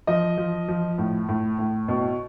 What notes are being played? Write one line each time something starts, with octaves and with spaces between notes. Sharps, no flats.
F3 D#5
F3
F3
A2
A2
A2
B2